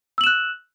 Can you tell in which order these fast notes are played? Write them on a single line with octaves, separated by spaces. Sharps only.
E6 F#7 E7 F#6